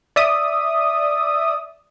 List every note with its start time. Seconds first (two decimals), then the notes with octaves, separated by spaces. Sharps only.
0.16 D5 E5 D#6